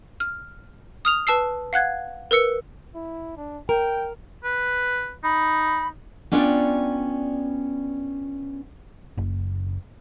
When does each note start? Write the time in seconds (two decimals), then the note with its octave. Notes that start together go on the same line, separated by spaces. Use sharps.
0.20 F6
1.05 D#6 F6 F7
1.27 B4 A5 E6 C7
1.73 F5 F#5 F#6 G#6
2.31 A#4 B4 E6 C#7
2.95 E4
3.37 D4
3.69 A#4 G5
4.44 B4
5.24 D#4 B5
6.32 B3 C#4 D4 F4 D5 G5
9.18 F#1